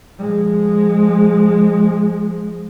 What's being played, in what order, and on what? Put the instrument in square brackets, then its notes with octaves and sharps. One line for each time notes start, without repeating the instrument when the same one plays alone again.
[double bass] F3 G#3